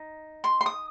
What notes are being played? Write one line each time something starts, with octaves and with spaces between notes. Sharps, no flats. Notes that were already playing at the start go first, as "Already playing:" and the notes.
Already playing: D#4
C6
C6
D#6